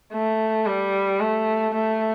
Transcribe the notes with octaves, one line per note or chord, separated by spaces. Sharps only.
A3
G3
A3
A3